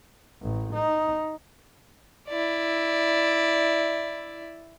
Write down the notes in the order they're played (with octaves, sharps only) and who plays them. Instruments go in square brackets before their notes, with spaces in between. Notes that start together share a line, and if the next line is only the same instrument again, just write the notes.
[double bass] A1
D#4
[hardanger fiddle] E4 D5